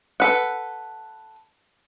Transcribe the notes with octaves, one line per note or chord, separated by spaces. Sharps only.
A4 B4 F#5